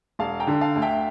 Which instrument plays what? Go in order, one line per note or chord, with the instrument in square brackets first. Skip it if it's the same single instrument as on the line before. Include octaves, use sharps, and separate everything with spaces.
[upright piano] E1 [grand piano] F5 A5
[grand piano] G5 A#5
[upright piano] D3
[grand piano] F5 A5
[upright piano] D2
[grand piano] E5 G5